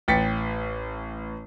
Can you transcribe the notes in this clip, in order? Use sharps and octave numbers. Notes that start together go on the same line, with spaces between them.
A1 G5 A6 B6 C#7